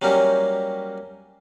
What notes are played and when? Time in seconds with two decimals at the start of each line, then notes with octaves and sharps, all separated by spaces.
0.02 F#3 G3 A#3 C#4 G4